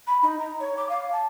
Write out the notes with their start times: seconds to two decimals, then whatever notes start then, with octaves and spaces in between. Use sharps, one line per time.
0.07 B5
0.23 D#4
0.39 A#5
0.60 C#5
0.77 D6
0.89 F5
1.12 A5